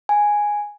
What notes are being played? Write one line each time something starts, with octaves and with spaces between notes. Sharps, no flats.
G#5